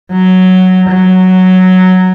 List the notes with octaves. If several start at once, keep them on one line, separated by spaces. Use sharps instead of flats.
F#3
F#3